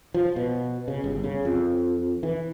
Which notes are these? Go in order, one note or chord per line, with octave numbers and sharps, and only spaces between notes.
F3
B2
C#3
G1
C#3
F2
E3